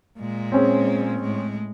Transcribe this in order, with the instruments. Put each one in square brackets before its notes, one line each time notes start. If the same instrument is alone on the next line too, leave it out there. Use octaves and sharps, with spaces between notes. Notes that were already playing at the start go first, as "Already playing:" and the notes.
[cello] A#2 G#3
[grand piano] C4 C#4 G#4
[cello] A2 G#3